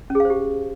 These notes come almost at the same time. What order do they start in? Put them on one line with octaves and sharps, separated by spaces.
C#4 G#4 F5 C5 G4